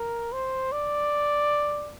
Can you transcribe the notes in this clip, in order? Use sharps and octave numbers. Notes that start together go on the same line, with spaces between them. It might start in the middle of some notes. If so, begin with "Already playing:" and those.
Already playing: A#4
C5
D5